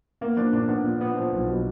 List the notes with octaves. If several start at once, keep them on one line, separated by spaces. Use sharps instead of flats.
A#3 B3
F3 D4
A#2 D4
B3 D4
A#2
B3
F3
B1
B2